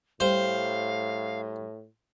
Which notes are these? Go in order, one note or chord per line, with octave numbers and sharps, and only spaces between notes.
A2 G3 C5 F5 G5